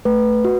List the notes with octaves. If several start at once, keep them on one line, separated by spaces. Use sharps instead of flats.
A3 B4
F#4